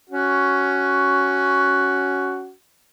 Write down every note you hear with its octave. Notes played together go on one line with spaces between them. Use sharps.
C#4 F#4